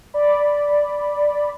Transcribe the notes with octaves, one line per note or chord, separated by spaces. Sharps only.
D5 B5